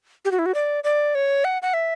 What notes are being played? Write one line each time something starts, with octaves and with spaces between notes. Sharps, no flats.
G4
F#4
E4
F#4
D5
D5
C#5
F#5
F#5
E5